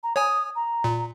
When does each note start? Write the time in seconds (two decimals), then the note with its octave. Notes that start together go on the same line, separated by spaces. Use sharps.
0.03 A#5
0.16 C#5 G#5 D#6
0.56 A#5
0.84 A#2